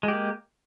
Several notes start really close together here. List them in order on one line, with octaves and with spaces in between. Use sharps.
G#3 G4 A#3